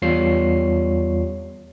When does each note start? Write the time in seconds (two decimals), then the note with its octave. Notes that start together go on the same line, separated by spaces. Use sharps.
0.02 E2 G3 F4 C#5 C7